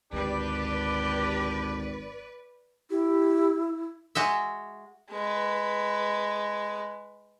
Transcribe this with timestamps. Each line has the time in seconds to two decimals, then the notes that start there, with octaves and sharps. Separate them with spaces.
0.13 G#1 D2 D4 G4 B4 D5
2.90 E4 G4
4.15 G#3 F#4 E5
5.11 G#3 B4